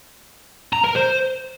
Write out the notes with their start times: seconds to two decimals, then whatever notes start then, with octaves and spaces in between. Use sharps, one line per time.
0.73 A#5
0.84 A#4
0.96 C5